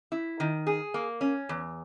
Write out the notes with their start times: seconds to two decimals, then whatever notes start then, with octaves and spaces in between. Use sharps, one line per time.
0.12 E4
0.40 D#3
0.67 G#4
0.94 A#3
1.21 C#4
1.49 E2